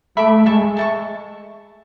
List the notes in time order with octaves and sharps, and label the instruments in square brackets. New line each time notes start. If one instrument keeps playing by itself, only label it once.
[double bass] A3 [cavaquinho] A4 E5 B5 D6
[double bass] G#3 [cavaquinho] A4 E5 A5 C#6
[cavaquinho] A4 E5 A5 C#6